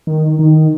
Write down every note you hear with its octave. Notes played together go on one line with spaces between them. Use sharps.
D#3
D#3